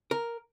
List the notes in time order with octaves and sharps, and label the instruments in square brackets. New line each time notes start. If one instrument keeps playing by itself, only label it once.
[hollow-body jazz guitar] A#4